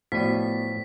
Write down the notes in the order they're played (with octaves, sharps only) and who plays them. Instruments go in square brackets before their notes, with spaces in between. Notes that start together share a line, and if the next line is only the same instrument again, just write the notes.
[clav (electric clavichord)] A2 F3 [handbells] B3 F#4 D5 [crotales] B6